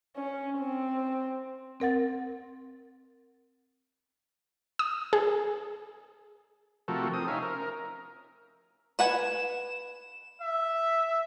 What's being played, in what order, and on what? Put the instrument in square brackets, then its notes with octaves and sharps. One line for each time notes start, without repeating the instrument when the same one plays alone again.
[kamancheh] C#4
C4
[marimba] C4 A#4 F#5 A6
[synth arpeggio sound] D#6
G#4
[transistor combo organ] C3 F3 A3 F#4 A4 A#4
C4 D#6
C#4 D#4 E5 F5
A#4
[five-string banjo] B4 F#5 G#5 [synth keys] E7
[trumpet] E5